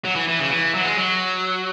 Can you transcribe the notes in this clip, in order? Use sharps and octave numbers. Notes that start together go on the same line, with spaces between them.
F#3
E3
E3
C#3
E3
F#3
G#3
F#3